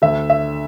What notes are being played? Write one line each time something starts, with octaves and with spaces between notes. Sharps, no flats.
D2 D3 A3 E5
E5